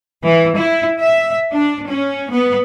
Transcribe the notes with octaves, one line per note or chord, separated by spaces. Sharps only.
E3
E4
E5
D4
C#4
B3